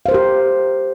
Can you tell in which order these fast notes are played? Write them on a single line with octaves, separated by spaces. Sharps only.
F5 C5 A#4 G4